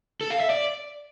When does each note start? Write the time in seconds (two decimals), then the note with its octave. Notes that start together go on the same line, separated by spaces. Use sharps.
0.21 A4
0.30 F5
0.40 E5
0.50 D5